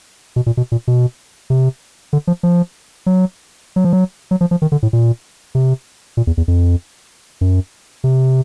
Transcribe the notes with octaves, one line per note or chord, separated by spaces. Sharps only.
B2
A#2
B2
A#2
B2
C3
D3
F3
F3
F#3
F#3
F3
F#3
F#3
F3
F3
D#3
D3
A2
A#2
C3
A#2
E2
E2
F2
F#2
C3